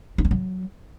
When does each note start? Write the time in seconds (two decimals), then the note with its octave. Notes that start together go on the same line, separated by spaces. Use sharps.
0.18 D#4
0.25 C#4
0.31 F#3